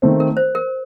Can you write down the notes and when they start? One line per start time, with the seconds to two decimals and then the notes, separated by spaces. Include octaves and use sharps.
0.02 D#3 A3 C4
0.20 A#4
0.37 C5
0.55 A#4